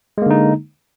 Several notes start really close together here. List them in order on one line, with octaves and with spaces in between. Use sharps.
G#3 A#3 D3 D#4